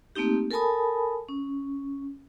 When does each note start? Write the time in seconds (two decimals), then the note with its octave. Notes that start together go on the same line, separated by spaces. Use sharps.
0.15 A3 A#3 C4 D#4 G4
0.51 A4 A#4 G#5 A5 B5 D#6
1.29 C#4